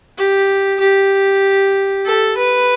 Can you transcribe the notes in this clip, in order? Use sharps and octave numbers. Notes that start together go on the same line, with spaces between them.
G4
G4
A4
B4